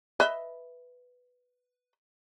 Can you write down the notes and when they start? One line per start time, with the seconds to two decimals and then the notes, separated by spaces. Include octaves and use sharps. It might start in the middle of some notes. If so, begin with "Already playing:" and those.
0.20 B4 D#5 E5